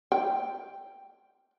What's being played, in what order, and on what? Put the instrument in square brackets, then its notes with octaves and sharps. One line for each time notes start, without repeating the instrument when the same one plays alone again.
[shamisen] G5